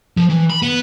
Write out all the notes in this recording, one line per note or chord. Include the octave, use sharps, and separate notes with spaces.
F3
E3
B5
B3